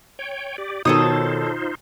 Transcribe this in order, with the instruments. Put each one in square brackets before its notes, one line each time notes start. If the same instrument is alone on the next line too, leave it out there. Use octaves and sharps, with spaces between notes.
[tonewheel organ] C#5 G5
G4 D5
[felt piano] B2 D#3 [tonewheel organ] D#4 F4 C5 [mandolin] A4 C#5 D#6